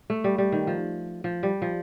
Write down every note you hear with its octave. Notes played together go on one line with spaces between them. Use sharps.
A3
G3
G3
D#3
F3
F3
G3
F3